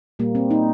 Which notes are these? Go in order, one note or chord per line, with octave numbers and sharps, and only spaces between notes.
A#2 G3 A#3
C4
D#4